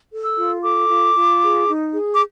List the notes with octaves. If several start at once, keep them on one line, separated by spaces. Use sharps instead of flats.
A4
E6
F4
A4 D6
F4
F4
G#4
D#4
G#4
D6